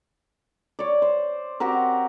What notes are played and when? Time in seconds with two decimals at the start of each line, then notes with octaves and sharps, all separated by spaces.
0.79 C#5 D5
1.02 C5
1.60 C4 F#4 G4 A#4